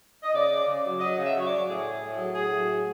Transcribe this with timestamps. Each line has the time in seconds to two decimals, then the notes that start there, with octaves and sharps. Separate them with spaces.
0.23 D#5
0.33 C#3 D5
0.50 C#3
0.66 C#3
0.83 F#3
0.99 F#3 D#5
1.17 C#3
1.23 E5
1.34 F#3
1.40 C#5
1.45 D5
1.51 F#3
1.67 A2 G#4
1.84 A2
2.01 A2
2.17 F#3
2.34 A2 G#4
2.52 F#3
2.69 A2